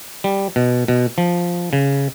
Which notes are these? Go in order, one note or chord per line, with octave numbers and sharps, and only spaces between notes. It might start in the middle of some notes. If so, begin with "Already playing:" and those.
G3
B2
B2
F3
C#3